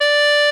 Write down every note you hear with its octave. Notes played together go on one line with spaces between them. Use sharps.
D5